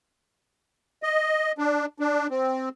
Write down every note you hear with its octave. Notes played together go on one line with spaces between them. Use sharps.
D#5
D4
D4
C4